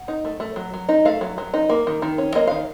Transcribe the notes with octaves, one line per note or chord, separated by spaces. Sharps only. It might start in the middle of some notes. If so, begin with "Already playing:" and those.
Already playing: F#5
D#4
A3
A3
F#3
F#3
D#4
A3 F5
F#3
F#3
D#4
A#3
D#3
D#3
C#4
A#3 D#5
D#3 F5